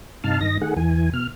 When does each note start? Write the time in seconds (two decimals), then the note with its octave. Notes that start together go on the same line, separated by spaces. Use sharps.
0.24 G2 C3 D#4 F5 A5 F6
0.41 G2 D#3 D#5 A#6
0.61 D#3 A3 G#4 F#5
0.77 E2 E3 G#5
1.14 B2 F6